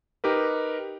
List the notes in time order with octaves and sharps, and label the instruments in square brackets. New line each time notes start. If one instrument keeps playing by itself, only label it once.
[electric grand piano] D#4 G4 A#4 B4